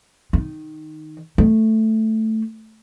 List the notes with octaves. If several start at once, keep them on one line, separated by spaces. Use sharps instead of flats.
D#3
A3